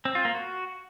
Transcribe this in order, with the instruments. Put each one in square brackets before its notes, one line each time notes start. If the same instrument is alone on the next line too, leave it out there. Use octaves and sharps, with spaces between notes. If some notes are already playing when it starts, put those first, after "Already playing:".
[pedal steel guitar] C4
F4
A#3
F#4